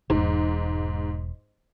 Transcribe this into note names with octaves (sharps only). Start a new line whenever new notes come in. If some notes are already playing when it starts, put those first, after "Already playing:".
E1 G#2